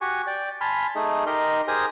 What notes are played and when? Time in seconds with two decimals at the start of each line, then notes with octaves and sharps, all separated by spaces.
0.01 F#4 G4 G#5 C#6
0.27 D5 G5
0.61 G#5 A5 B5 C6 F6
0.95 A3 D#4 G#4
1.26 D#4 G4 A#4 D#5 C6
1.68 G4 G#4 A#4 C5 G#5 D#6